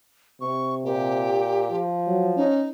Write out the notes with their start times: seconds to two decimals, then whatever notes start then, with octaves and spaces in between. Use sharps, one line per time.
0.41 C3 C#6
0.85 A#2 G4
1.71 F3
2.07 F#3
2.37 C#4 D#4